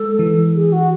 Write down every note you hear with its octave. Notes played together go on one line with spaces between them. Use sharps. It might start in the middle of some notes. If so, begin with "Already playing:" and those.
Already playing: G#3 A4
E3
G#4
F#4